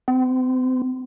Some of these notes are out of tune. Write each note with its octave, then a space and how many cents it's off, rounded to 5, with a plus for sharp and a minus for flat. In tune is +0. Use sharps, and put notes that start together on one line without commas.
C4 -40